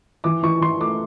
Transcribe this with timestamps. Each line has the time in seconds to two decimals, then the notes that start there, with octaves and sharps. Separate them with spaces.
0.24 E3 D6
0.43 E3 C#6
0.61 E3 C6
0.80 A3 D6